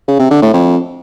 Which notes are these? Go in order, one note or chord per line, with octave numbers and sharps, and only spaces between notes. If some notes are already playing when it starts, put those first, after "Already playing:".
C#3
C3
D3
A2
F2